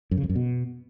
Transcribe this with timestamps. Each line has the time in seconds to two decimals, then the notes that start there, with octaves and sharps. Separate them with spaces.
0.11 F#2
0.17 C#3
0.23 F2
0.29 F#2
0.35 B2